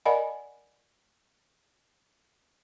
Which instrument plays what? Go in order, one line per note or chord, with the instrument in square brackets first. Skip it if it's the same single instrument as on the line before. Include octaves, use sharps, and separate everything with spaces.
[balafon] A#4 D5 D#5 F#5 G#5 B5